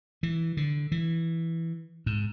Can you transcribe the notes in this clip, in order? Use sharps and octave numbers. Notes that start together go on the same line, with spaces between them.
E3
D3
E3
G#2